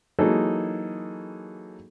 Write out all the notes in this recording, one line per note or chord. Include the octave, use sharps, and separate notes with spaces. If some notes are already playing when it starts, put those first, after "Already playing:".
E3 F#3 A#3 D#4 G#4 A4